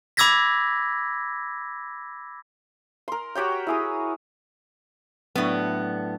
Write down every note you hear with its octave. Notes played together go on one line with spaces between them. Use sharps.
B5 D6 E6 G#6 A#6 B6
A#4 C6
F#4 G4 C#5 G5
E4 G#4 D#6
A2 F#3 B3 D4